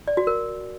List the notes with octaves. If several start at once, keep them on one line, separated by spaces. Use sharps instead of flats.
D5
F#4
A#4